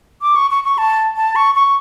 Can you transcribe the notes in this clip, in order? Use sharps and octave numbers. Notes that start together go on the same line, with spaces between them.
D6
C#6
C#6
C#6
A5
A5
C#6
C#6